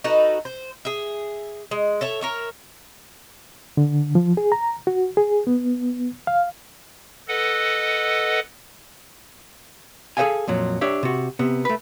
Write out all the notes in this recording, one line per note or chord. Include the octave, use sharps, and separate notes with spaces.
D#4 F#4 A4 B4
C5
G#4 E5
G#3
A4 C#5 E5
A#4 C#5 E5
D3
F3
G#4
A#5
F#4
G#4
B3
F5
A4 B4 D#5 F#5
G#4 A4 C5 D#5 F5 G#5
F2 A#2 F#3
D4 G4 C#5 E5
C3 F#4
C3 B3
A3 B4